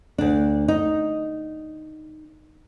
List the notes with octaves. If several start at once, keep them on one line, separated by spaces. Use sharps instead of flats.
D2 D4
D#4